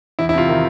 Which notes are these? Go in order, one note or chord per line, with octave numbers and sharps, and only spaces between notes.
E2 E4
E4
C3 F4
D#3